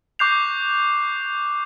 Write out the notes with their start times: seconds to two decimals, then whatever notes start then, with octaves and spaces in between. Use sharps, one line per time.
0.19 C#6 D6 F#6 G6 C7 F7